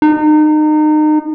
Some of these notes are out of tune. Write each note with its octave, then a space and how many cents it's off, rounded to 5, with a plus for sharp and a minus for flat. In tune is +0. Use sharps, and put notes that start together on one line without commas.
D#4 -30